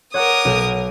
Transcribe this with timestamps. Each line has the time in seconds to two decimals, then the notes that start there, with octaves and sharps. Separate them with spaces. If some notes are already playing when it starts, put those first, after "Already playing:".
0.14 A#4 C#5 F#5 D6 D#6
0.45 B1